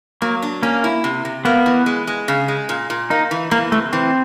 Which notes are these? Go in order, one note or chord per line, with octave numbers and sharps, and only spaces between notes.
F#3 A#3
D4
A#3 C#4
E4
C3
C3
A#3 B3
E3
G#3
G#3
C#3
G#3
A#2
A#2
A#3 D#4
E3
E3 A#3
C3 A3
E3 C4